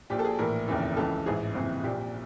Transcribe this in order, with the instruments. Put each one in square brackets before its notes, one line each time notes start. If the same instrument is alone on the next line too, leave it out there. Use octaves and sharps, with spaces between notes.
[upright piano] A#1 A#2 G4
A4
G#4
A#1 A2 E3 A#4
F1 D#2 C#3 E3
C#2 C#3 E3 A4
A1 G#2 E3 G#4
F#1 F2 C3 E3
A#1 A#2 G4